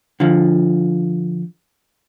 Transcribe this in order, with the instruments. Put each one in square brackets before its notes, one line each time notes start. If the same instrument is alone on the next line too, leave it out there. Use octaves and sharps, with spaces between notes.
[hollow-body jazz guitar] D3 F3